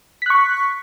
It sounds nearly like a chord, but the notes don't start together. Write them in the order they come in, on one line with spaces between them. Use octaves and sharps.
B6 F#6 C#6